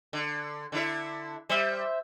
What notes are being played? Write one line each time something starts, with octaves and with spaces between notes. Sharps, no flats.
D3
D3 E4 E5
G3 C5 E5